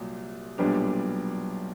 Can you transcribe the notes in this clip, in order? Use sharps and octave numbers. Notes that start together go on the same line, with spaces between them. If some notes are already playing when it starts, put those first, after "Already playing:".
Already playing: C2 A#2 F#3
B1 A#2 G3 B3 D4